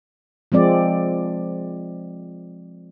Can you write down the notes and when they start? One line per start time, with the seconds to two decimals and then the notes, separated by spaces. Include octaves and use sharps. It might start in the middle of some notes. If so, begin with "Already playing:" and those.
0.52 F3 G#3 C4 D5